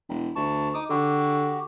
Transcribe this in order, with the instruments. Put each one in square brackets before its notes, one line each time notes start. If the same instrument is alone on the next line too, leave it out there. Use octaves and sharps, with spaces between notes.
[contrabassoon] E1
[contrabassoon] D2 [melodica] A5 C#6
[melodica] D#4 D6 D#6
[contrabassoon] D3 [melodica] F#4 G4